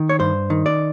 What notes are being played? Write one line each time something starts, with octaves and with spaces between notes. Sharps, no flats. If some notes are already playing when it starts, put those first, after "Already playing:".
Already playing: D#3
C#5
G2 C5
D#3
D5